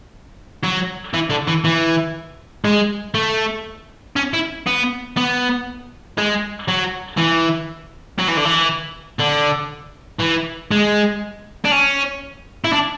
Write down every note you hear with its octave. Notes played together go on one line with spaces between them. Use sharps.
F#3
E3
D3
E3
E3
G#3
A3
C#4
E4
B3
B3
G#3
F#3
E3
F#3
E3
D3
E3
D3
E3
G#3
D4
C#4
E4
D4